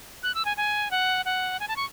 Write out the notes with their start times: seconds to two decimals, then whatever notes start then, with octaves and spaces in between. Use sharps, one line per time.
0.23 F#6
0.35 E6
0.45 G#5
0.57 G#5
0.91 F#5
1.25 F#5
1.60 G#5
1.68 A5
1.76 C#6